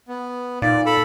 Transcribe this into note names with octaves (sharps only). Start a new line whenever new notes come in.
B3
A#2 D#4 D5 F5 A6
A4 B5